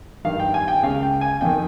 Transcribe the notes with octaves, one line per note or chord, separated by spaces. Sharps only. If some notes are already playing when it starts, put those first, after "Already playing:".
G2 D#3 F5
G5
G#5
G5
C#2 C#3 F5
G5
G#5
F2 D#3 G5